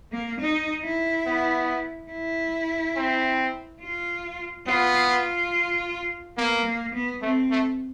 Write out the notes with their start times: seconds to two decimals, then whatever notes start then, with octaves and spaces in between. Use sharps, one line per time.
0.12 A#3
0.41 D#4
0.84 E4
1.26 B3
2.11 E4
2.96 C4
3.81 F4
4.67 B3 F4
5.09 F4
6.37 A#3 B3
6.66 A#3
6.94 B3
7.22 A3 C4
7.51 A3